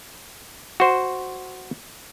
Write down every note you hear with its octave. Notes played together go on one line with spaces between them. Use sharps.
F#4 C5